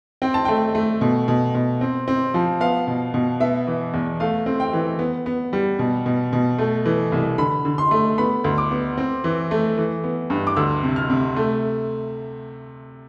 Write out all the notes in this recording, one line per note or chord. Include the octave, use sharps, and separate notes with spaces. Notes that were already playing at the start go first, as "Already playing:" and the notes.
C4 G5
A5
A3 G5
A3
B2
B2
B2
C4
C4
F3
B3 F5
B2
B2
B3 E5
E3
E2
A3 F5
C4
G5
E3
B3
B3
G3
B2
B2
B2
A3
E3
C2
D3 B5
D3
C6
A3
B3 B5
D2
D6
B3
C4
E3
A3
E3
B3
G2
D6
D2 E6
C3
F6
C3
A3